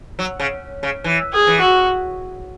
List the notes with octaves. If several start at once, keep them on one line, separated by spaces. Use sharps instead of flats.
F#3
C#3
C#3
E3
G#4
E3
F#4